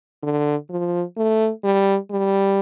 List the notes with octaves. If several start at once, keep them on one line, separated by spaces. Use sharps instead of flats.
D3
F3
A3
G3
G3